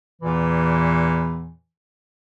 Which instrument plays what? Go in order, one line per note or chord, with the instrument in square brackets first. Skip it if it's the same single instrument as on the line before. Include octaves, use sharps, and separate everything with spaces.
[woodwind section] E2 A#2 E3